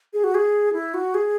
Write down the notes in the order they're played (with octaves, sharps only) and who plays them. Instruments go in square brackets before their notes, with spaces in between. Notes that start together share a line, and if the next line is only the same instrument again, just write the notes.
[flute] G#4
F#4
G#4
E4
F#4
G#4